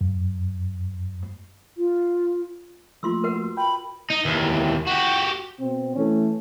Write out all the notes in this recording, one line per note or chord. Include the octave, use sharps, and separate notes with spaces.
F#2
F4
F3 A3 A#3 F4 C6 E6
A#4 B4 F#5
F#4
G5 B5
D#4
D#2 E3
F#4 G4
B2 C4
E3 A3 C#4